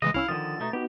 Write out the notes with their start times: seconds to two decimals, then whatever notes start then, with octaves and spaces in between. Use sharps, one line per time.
0.02 C#3 E3 G#3 D#5
0.14 C2 C#4 E4 F5 E6
0.28 D3 D#3 F3 D#6 A6
0.60 B2 A3 D#4
0.73 B3 D#4 F#4 G4